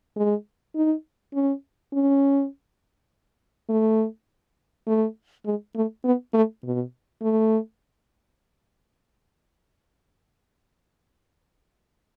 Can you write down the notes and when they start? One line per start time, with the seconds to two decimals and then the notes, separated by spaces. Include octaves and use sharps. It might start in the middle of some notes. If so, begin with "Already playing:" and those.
0.16 G#3
0.75 D#4
1.34 C#4
1.93 C#4
3.70 A3
4.87 A3
5.45 G#3
5.75 A3
6.05 B3
6.34 A3
6.64 B2
7.22 A3